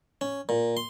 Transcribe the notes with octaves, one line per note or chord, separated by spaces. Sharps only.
C#4
A#2
C6